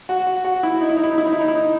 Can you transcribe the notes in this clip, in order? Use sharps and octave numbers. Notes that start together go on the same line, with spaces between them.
F#4
F#4
F#4
E4
D#4
E4
D#4
E4
D#4
E4
D#4
E4
D#4
E4
D#4